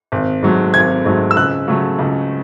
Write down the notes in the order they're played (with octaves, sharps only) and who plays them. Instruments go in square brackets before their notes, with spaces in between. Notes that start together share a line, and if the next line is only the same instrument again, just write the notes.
[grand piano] G#1
G#2 F#3 A3
G#1 G#6
G#2 F#3 A3
E6
C#2 F#6
C#3 F#3 A3
C#2